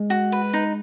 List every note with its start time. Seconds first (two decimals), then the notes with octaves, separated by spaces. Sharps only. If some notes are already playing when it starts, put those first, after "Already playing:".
Already playing: G#3
0.10 F#4
0.32 B4
0.53 D#4